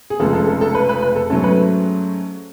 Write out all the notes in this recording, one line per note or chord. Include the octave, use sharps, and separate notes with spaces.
G#4
F1 F2 C#3 G#3 A4
A4
A4
A4
B4
B4
B4
A4
G#2 F#3 A3 C#4 A4
B4